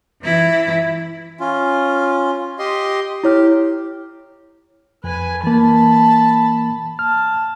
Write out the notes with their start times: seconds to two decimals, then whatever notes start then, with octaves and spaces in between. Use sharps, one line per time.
0.22 E3 E4
1.40 C#4 F4
2.59 G4 D#5 C6
3.24 E4 G4 C#5 F6
5.04 F2 B4 G#5
5.44 E3 A#3 A5 B5
6.99 A5 F6